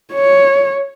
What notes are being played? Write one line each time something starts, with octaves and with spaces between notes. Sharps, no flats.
C#5